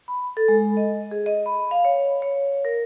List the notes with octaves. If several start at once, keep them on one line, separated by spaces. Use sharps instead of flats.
B5
A4
G#3
D#5
G#4
D#5
B5
F5
C#5
C#5
A#4